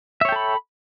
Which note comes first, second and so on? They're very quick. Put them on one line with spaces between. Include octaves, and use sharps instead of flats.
E5 C#5 G5 A4 B5